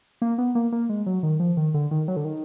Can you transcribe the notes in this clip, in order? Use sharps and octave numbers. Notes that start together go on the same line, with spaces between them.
A#3
B3
A#3
A#3
G#3
F#3
D#3
F3
D#3
D3
D#3
F#3
D3
D#3